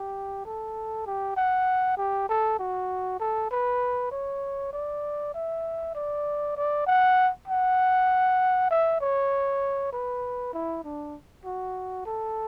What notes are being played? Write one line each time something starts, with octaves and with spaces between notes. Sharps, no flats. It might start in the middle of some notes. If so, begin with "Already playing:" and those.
Already playing: G4
A4
G4
F#5
G4
A4
F#4
A4
B4
C#5
D5
E5
D5
D5
F#5
F#5
E5
C#5
B4
E4
D4
F#4
A4